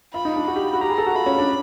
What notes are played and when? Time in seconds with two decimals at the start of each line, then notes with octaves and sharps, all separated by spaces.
0.14 F4 B5
0.25 D#4
0.36 D4
0.47 F#4 B5
0.56 G4
0.73 F#4
0.81 G4 A#5
0.90 G#4
0.98 A4
1.06 F#4
1.15 F4 B5
1.26 C#4
1.38 D4